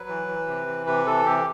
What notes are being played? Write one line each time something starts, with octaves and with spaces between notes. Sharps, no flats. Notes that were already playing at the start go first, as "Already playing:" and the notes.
Already playing: F#3 B4
E3
E3
C3
E3
C3 B4
E3 A4
C3 G4